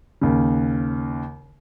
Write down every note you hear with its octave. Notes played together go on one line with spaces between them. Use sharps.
D#2 C#3